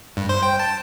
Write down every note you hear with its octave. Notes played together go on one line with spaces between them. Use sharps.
G2
C5
G5
A5